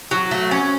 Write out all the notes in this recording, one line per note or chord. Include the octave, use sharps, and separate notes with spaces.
F#3
A3
C#4